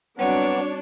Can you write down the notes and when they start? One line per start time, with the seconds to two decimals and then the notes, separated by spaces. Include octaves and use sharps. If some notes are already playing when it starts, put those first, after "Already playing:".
0.19 F#3 G3 B3 C4 D4 F#4 C#5